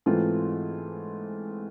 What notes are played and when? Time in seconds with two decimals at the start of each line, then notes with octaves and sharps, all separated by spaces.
0.06 G#2 E3 A3 C4 F4